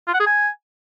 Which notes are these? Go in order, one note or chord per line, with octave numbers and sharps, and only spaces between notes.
F4
F#5
G#4
G#5